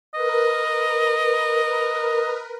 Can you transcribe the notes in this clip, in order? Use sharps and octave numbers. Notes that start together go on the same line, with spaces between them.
A#4 B4 D#5